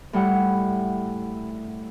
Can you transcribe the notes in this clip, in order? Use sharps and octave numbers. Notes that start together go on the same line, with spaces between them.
A2 G3 E4 F#5